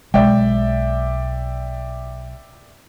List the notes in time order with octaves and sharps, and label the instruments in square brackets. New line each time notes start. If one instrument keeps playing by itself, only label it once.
[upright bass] B1 [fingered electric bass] G#3 [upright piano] D5 E5 G5